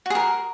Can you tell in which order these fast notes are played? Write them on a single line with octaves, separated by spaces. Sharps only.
F#4 G#4 A#4